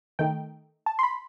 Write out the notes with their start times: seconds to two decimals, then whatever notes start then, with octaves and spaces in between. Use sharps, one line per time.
0.19 D#3 A3 D#4 G5
0.86 A5
0.99 C6
1.03 B5